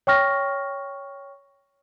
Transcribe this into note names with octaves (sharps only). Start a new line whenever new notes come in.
C#5 G5 C#6 F6 A#6